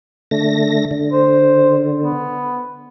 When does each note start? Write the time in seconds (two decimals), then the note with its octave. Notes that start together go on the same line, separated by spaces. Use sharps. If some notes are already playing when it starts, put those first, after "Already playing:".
0.31 D3 A3 A#6
0.91 D3
1.13 C5
2.02 B3